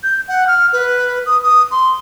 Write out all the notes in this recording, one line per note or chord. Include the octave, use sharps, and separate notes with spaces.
G6
F#5
F6
B4
D#6
D#6
C6